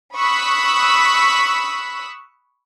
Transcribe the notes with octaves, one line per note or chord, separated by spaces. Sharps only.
B5 C#6 D#6 E6 F#6 B6